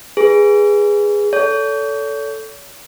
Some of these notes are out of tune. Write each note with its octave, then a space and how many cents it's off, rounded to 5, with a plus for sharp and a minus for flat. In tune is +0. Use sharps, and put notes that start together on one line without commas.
G#4 -10 B4 -10
A4 +0 C#5 +40